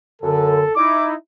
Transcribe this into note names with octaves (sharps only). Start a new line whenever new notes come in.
F#2 D3 A4
D#4 E4 D6